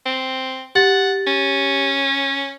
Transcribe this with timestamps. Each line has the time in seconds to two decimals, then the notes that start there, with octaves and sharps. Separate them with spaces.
0.06 C4
0.75 G4 F#5 A6
1.27 C#4